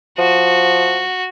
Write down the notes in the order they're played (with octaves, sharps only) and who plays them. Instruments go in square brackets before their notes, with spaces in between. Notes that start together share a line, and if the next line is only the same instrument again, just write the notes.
[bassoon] F3 [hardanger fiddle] F#4